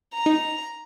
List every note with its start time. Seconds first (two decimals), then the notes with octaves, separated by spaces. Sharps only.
0.15 A#5
0.26 D#4